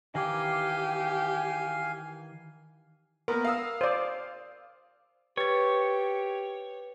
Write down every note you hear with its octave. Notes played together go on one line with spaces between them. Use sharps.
D#3 E3 G4 F5 G#5 D6
A#3 B3 A#4
F5 D#6 E6
C5 D5
G4 B4 C#5 A6